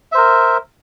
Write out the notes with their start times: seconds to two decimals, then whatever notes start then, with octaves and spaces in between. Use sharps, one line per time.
0.12 E5
0.15 C5
0.17 A#4